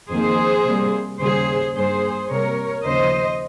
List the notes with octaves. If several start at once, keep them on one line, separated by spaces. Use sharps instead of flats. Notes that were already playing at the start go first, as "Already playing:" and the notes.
F2 D#3 A#3 G#4 C5
C3 G3 A#3
D#2 C#3 G3 G#4 C5
G2 G3 A#3 G#4 C5
C3 G3 A#3 A#4 C#5
D#2 C#3 F3 C5 D#5